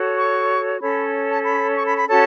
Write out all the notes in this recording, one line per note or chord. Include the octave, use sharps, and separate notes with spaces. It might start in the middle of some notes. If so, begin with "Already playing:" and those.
Already playing: F#4 A4 C#5
C#6
C#4 A4 C#5 B5
A5
B5
C#6
B5
B5
C#4 F#4 A4 C#5 A5